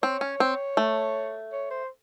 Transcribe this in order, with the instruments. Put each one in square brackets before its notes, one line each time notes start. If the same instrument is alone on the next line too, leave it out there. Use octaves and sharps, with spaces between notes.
[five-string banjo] C4 [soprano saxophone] C#5
[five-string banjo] C#4
C4
A3
[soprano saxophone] C#5
C5